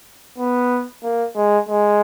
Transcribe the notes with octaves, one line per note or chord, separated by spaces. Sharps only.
B3
A#3
G#3
G#3